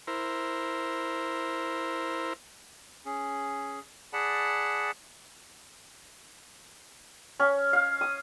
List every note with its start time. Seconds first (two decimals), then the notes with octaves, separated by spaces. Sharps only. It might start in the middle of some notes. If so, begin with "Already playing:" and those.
0.07 E4 A#4 C5
3.06 C#4 G#4
4.13 G#4 D5 F#5 A5 B5
7.40 C#4
7.73 F5
8.01 D#6